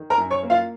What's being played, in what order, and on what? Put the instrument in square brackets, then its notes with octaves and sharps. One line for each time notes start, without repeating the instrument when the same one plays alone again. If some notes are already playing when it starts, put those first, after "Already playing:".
Already playing: [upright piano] D#3
A#4 A#5
F#2
C#5 C#6
A#3
F4 F5